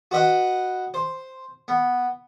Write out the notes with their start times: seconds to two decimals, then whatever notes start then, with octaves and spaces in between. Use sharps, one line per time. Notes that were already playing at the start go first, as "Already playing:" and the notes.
0.11 F#4 B4 D#5 F#5
0.94 C5
1.68 B3